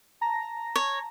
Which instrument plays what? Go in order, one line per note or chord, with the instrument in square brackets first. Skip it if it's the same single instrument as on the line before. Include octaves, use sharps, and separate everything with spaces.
[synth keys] A5 A#5 A#6
[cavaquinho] C#5